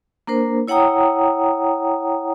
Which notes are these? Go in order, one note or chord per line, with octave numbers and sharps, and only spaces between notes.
A#3 D4 A#4 C5
E4 C#5 F#5 G5 A#5 D#6